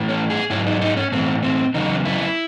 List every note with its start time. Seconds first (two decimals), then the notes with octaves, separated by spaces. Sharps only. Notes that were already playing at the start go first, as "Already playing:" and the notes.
Already playing: A2 E3
0.09 C#4
0.30 G#4
0.50 G#2 F#3 E4
0.66 D#4
0.81 D#4
0.97 C#4
1.12 A2 E3 C4
1.43 C4
1.74 E2 C#3 F#3 D#4
2.05 E4